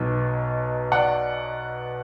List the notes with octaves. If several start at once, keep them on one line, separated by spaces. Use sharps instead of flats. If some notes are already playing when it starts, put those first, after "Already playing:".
Already playing: B1 B2 F#3 B3
D5 F#5